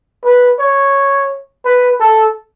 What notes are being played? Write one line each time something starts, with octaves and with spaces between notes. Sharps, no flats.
B4
C#5
B4
A4